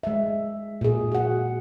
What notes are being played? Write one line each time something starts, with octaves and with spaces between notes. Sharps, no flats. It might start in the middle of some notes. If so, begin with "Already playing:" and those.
G#3 E5
A#2 G#4
F#4 F#5